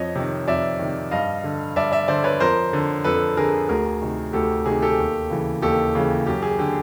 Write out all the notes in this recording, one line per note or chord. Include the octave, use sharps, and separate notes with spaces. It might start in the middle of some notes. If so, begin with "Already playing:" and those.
Already playing: F2 C#5 D#5
C3 D#3
F2 D5 E5
C3 D#3
G2 D#5 F5
D3
G2 D5 E5
D5 E5
D3 C5 D5
B4 C#5
F2 A#4 C5
D3
F2 A4 B4
D3 G#4 A#4
D2 G#4 A#4
C3 D#3
D2 G4 A4
C3 D#3 G#4
G4 A4
D#2
C#3 E3
D#2 G4 A4
C#3 E3
F#2 G4
G#4
D3 G4